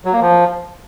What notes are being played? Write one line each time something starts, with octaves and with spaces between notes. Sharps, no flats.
F#3
A#3
F3